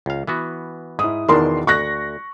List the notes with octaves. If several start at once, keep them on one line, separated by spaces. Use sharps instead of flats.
C#2 F5
E3 B3 F#4
G#2 E4 D#6
E2 B2 D#3 D4 A#4 C6
D2 C#6 F#6 A#6